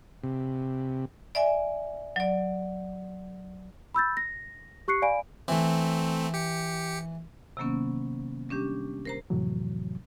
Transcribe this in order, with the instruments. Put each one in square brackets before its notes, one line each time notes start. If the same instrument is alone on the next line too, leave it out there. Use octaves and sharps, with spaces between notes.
[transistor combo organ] C3
[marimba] D5 E5 G#5
F#3 D5
[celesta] B5 E6 G6 A6
A#6
G4 C#6 F#6 C7 C#7
D5 F5 G#5 B5 D7
[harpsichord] E3 [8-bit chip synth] A3 C4
[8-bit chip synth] G4 C#7
[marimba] C3 D#3 F#3 A#3 B3 C#4
G3 C#4 D4 G4
A#4 C5 A#5
[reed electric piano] F2 A2 C3 E3 F#3